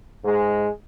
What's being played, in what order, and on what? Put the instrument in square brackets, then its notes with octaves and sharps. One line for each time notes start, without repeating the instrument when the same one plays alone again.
[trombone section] G#2 G#3